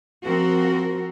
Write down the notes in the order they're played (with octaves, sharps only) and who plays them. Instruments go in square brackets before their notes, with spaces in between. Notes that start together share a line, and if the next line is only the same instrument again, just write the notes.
[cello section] F3 C4 F#4 A#4